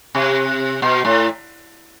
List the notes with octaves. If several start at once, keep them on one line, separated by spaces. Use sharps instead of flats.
C3
B2
A2